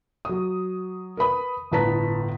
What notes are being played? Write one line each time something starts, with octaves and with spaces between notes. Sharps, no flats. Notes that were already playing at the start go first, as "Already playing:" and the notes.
F#3 D#6
A#4 B4 B5 D#6
G1 A2 B4 A5 A#5 B6